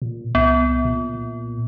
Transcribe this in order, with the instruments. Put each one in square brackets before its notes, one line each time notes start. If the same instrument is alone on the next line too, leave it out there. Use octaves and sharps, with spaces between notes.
[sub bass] A#2
[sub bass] C2 [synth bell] B3
[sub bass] A#2